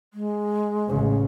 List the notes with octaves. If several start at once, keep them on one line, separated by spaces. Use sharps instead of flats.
G#3
A1 C#3